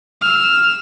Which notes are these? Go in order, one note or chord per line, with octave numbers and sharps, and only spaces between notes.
E6 F6